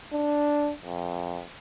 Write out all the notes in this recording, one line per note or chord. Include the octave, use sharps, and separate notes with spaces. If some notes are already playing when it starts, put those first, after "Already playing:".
D4
F2